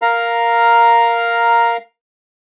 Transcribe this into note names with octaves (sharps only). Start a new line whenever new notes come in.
A#4 F5 A#5